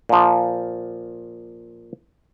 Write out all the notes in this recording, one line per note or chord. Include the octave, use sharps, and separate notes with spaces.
A#2 F3